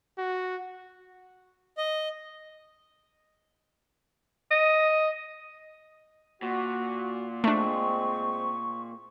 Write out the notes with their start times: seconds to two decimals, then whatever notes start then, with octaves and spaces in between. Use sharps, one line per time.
0.18 F#4
1.77 D#5
4.51 D#5
6.42 A#2 F#4
7.44 G#3 A3 C4 D4 C#6